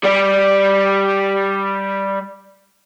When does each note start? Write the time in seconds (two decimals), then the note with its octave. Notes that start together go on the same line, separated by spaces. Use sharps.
0.04 G3 D5